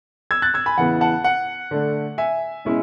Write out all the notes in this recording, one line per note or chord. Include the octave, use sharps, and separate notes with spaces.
E6 G#6
F#6 A6
E6 G#6
G#5 B5
E2 C#3 E3 B3 E4 F#5
F#5 A5
F#5
D3 A3 D4
E5 G#5
B2 G#3 C#4 E4